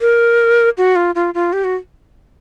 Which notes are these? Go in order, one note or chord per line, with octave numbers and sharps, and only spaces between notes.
A#4
F#4
F4
F4
F4
G4
F#4